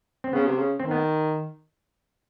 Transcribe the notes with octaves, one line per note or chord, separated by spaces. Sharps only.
C4
C#3 B3
C3
C#3
D#3 C4
B3